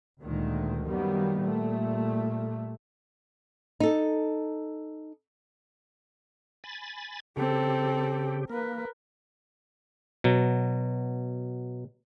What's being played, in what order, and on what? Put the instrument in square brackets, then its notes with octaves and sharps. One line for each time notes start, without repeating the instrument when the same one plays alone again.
[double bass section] D2 A#2 D#3 G#3
F#2 D#3 G3 A#3 B3
A#2 G3 A3
[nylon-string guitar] D#4 A4
[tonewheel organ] G#5 B5 A6
[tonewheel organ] C#3 G4 [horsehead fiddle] C4 A4
[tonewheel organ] A#3 [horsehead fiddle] A#4 B4
[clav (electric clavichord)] B2 F#3